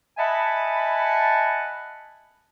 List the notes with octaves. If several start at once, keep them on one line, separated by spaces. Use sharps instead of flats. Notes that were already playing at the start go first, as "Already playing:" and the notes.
D#5 E5 F#5 G#5 A5 B5